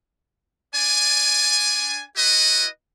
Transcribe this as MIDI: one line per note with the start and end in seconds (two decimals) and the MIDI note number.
0.75 2.04 62
0.75 2.04 74
0.75 2.04 80
2.17 2.67 64
2.17 2.67 66
2.17 2.67 71
2.17 2.67 75